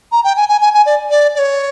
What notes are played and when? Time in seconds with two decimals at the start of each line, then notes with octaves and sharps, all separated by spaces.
0.12 A#5
0.24 G5
0.37 G#5
0.49 G#5
0.61 G#5
0.74 G#5
0.86 D5
1.10 D5
1.35 D5
1.39 C#5